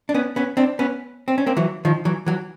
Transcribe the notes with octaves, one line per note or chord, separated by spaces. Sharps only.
D4
B3 C#4
B3 C#4
C4 D4
B3 C#4
C4
C#4
A#3 C4
E3 F#3
D#3 F3
E3 F#3
E3 F#3